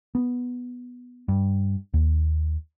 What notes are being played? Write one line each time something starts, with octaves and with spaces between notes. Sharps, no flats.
B3
G2
D#2